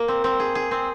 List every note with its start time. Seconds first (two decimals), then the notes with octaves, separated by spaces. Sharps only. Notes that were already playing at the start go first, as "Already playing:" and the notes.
Already playing: A#3
0.08 C4
0.24 C4
0.40 G#4
0.55 G#4
0.71 C4